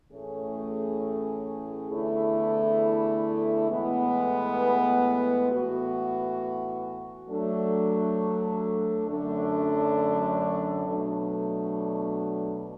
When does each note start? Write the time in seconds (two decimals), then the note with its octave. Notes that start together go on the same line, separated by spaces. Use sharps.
0.11 A2 E3 A3 C#4 G#4
1.91 E2 D3 A3 E4
3.70 A2 E3 G#3 B3
5.49 A2 E3 B3 F#4
7.29 F#3 A3 D4
9.07 F#2 D3 F#3 A3 D4
10.87 B2 F#3 A3 D4